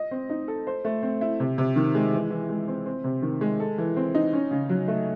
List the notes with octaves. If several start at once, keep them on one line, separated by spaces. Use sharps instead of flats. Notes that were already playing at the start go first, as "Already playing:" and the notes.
Already playing: D#5
C4
D#4
A4
C5
A3
C4
E4
C3
C3
D#3
G#3
E3
E3
G#3
C4
C4
C3
D#3
G#3
A4
E3
C4
D#4
C#4
C#3
F#3
A3